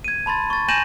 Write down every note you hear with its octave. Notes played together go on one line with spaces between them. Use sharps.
G#6 D#7
A5 B5 C6 A6
C#6 A6
G#5 G6 A#6 D#7 E7 F#7